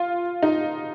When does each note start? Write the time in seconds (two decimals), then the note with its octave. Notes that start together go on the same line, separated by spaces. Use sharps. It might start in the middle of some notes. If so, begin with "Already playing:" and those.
Already playing: F4
0.43 D#4